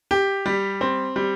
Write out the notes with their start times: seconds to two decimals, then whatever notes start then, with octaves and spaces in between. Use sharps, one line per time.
0.11 G4
0.46 G3
0.81 C4
1.16 G3